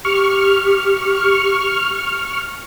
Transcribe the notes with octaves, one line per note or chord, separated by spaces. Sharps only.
G4 C#6 F6